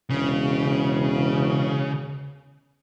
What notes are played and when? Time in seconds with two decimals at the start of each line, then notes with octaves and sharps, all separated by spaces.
0.10 E1 C#3